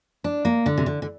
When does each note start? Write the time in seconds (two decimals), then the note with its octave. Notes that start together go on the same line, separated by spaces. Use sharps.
0.24 D4
0.45 A#3
0.66 D3
0.78 C3
0.86 D3
1.02 D3